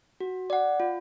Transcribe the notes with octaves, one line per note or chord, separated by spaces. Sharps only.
F#4
D5 F#5
F4